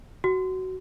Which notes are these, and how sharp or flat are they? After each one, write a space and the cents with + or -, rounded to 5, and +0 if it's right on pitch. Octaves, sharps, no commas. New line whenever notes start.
F#4 +15